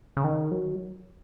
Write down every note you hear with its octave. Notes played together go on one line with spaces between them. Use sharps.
C#3
D#3
F#3